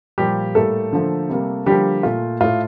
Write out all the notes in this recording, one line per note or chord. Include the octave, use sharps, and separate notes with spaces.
A#2 F3 G3 A#3 G4
A2 G3 A3 A#3 A4
D3 F3 A#3
C3 G3 A#3
D3 F3 G3 A#3 G4
A#2 A3 F4
A2 A3 F4